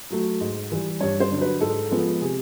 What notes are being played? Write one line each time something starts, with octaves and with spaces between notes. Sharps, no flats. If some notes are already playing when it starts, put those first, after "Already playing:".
F#3 A3
G#2
E3 G3
G2 C#5
C5
D3 F#3
B4
G#2 A4
F3 G#3 B3
C3 G#4